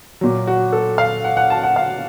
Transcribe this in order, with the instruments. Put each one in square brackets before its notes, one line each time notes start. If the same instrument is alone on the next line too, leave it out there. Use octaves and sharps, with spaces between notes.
[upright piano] A#2 F#3
F#4
A4
F5
F#5
F#5
A5
F#5
F5